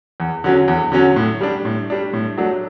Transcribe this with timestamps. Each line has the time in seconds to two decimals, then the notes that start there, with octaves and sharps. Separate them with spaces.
0.20 E2
0.44 D3 F#3 C#4
0.68 E2
0.92 D3 F#3 C#4
1.16 A2
1.41 G3 D4
1.65 A2
1.90 G3 D4
2.13 A2
2.38 F#3 A3 D4